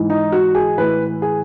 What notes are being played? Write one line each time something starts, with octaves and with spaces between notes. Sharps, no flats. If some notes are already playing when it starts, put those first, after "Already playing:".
Already playing: G#2 E3
D#4
F#4
G#4
A2 E3 B4
G#4